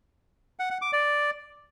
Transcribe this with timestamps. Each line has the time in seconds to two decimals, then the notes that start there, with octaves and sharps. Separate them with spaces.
0.59 F#5
0.70 F#5
0.82 D6
0.93 D5